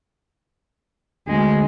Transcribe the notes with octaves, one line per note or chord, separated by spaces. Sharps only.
D2 G#3